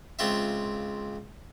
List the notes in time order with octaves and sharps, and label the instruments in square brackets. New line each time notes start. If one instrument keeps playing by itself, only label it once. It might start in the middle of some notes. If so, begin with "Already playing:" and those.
[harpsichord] C#2 C4 F4 E5